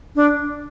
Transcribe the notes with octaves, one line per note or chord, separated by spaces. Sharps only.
D4